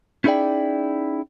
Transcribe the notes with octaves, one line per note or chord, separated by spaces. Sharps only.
C#4 D#4 E4 G#4 D5 G5